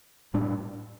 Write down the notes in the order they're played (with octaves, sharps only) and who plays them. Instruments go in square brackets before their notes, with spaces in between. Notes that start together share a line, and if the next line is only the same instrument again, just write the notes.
[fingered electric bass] A2 G3 D4